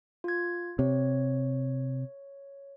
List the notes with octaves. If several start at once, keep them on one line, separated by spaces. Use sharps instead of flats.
F4 G#6
C3 C#5